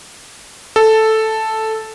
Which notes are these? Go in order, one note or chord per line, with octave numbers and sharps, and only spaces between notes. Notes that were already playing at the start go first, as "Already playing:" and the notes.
A4